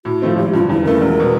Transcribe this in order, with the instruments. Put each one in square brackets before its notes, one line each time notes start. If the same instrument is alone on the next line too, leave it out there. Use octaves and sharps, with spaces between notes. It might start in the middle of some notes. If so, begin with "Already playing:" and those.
[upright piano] A2 [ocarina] F#4
[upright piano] F3 A3 C4
[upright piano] G#1 [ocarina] G4
[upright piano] G2 D3 [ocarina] F4
[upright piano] E2 [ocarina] E4
[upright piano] C#3 E3 A3 [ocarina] A#4
[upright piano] E1
B2